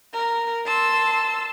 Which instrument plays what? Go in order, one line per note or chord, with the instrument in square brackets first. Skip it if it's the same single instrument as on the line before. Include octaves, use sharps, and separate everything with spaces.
[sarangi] A#4
[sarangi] A5 [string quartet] C6 E6